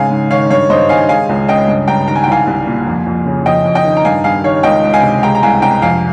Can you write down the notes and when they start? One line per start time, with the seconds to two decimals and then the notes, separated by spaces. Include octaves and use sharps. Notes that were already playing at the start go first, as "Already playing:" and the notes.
Already playing: G#2 C#3 F5 G#5
0.10 G#2
0.31 D#3 C#5 F5
0.50 G2 C#5 F5
0.70 G2 C5 D#5
0.89 D#3 F5 G#5
1.09 G#3 F5 G#5
1.29 C#2
1.48 C#3 D#5 G5
1.68 G2
1.88 G2 G5 A#5
2.08 D#3 A#5
2.16 G#5
2.24 G5
2.28 C2 F5 G#5
2.47 C2
2.67 A#2
2.87 F2
3.06 F2
3.26 C#3
3.45 F2 D#5 G5
3.65 F2
3.75 D#5 G5
3.85 D#3
3.97 A#5
4.05 G2 F5 G#5
4.24 G2 F5 G#5
4.44 D#3 C#5 F5
4.63 C#2 D#5 G5
4.84 C#2
4.93 F5 G#5
5.03 C3
5.23 G#3 G5 A#5
5.35 A#5
5.43 C2 F5 G#5
5.62 C3 G5 A#5
5.82 F2 F5 G#5